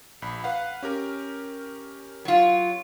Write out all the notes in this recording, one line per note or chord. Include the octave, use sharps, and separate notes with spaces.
A#1 B5
B4 F5 F#5
C#4 G4 A#4
F#3 F4